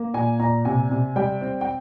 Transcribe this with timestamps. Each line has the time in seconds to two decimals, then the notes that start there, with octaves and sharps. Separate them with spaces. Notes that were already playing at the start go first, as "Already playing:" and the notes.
Already playing: A#3
0.14 A#2 G#5
0.39 A#2 A#5
0.65 C3 G#5
0.90 C3
1.16 G3 G5
1.41 C4
1.61 G5